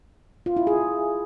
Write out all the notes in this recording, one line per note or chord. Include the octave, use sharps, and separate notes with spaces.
F4
E4
G#4